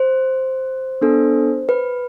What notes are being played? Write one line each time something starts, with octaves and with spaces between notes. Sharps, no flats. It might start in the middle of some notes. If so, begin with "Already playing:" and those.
Already playing: C5
B3 D4 A4
B4